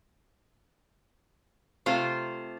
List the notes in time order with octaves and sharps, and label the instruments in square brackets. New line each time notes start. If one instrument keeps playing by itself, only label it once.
[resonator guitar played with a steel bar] C3 A3 F4 A4 C5